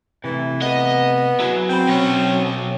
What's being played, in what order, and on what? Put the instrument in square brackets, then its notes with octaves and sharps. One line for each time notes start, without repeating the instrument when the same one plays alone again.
[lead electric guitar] C3 A3 [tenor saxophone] E3
[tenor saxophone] B3 [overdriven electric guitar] D#5
[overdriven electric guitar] F#3 [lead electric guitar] E4 G#4
[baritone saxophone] C4 [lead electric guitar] G5 B5
[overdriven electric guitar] B2 C#5 [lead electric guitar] F#3 [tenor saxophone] C#4